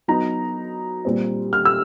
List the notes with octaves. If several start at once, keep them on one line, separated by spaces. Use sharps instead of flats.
F#3 B3 D#4 A#5
A#2 G3 C4
F6
E6